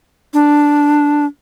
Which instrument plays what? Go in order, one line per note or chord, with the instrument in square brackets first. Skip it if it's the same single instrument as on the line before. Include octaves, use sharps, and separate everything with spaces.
[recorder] D4